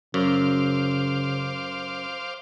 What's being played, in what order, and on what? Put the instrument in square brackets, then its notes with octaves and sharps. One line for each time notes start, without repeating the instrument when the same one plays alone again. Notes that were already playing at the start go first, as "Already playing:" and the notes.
[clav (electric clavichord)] F#2 [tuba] C#3 [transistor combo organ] C5 F5 D6